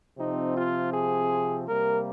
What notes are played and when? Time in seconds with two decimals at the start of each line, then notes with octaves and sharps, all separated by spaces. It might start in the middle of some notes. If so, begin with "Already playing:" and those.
0.18 C3 F3 C4 D#4
0.57 F4
0.93 G#4
1.68 C3 G3 A#3 A#4